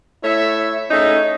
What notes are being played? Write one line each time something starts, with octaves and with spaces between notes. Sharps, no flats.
A3 E4 C#5 E5
A3 C#4 D#4 G#4 D#5